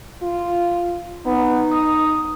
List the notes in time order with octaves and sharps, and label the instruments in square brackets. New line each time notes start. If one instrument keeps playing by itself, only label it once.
[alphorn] F4
[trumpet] B3 [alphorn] D#4
[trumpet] D#6